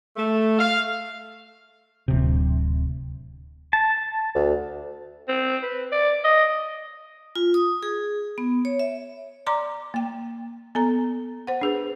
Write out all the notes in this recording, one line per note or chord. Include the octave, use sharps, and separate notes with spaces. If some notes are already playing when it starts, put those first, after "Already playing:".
A3
F5
D1 C3
A5
D2
C4
B4
D5
D#5
F4
D#6
G#4
B3
C#5
E5
D5 A#5 C6 D6
A#3 G5
B3 A4 A#5
C5 F#5
D4 G#4 B4